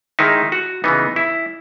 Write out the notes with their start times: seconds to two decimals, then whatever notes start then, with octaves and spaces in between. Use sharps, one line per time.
0.19 D#3 G#3 D#4 E4
0.52 F#4
0.84 C#3 E3 B3 D#4
1.16 E4